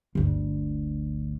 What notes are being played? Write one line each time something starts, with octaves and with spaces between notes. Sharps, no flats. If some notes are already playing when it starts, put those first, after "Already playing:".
G1 D2